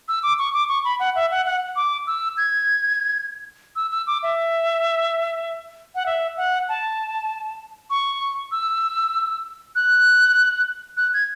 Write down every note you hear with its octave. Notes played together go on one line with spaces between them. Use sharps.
E6
D6
C#6
D6
C#6
B5
F#5
E5
F#5
F#5
D6
E6
G#6
E6
E6
D6
E5
F#5
E5
F#5
A5
C#6
E6
F#6
F#6
G#6